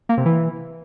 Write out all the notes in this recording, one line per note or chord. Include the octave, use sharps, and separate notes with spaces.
A#3
C3
E3